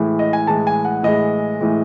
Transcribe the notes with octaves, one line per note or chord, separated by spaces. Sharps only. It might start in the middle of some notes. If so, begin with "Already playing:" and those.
Already playing: A2 E3 G#3
D#5
G#5
A2 E3 G#3 A5
G#5
F#5
A2 E3 G#3 D#5
A2 E3 G#3